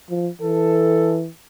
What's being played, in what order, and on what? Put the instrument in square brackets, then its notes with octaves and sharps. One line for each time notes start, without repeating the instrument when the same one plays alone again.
[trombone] F3
[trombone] E3 [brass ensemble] A4